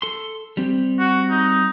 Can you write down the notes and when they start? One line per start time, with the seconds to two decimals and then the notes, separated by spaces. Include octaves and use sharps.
0.02 A4 C6
0.57 G3 C4 G4
1.00 F#4
1.30 D#4